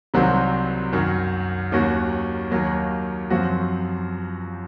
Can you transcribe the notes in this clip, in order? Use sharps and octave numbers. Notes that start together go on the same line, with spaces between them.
C2 C3 D#3 F#3 C4
F#2 D#3 F#3
D#2 D#3 F#3 C#4 F#4
D#2 D#3 F#3 A#3
F#2 F3 C4 F#4